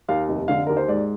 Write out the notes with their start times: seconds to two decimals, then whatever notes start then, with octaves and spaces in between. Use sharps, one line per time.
0.08 D#2 F5
0.29 F1
0.48 D3 F5
0.67 D#2 A#4
0.77 C5
0.88 G#2 D5